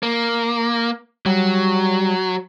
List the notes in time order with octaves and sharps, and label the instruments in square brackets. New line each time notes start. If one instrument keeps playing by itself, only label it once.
[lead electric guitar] A#3
[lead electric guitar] F#3 [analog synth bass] G3